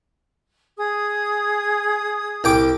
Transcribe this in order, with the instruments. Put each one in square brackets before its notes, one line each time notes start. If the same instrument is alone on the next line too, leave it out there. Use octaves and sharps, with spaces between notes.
[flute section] G#4 D#6
[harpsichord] C2 G5 D6